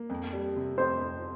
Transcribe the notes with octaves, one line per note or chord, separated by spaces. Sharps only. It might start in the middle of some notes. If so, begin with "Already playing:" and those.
Already playing: A#3
F2
G3
C3
F2 C5
F2